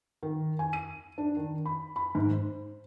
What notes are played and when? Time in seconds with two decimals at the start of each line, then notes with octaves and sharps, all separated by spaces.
0.23 D#3
0.59 G#5
0.73 D#7
1.18 D4
1.37 D#3
1.66 B5
1.96 B5
2.15 G#2
2.31 C5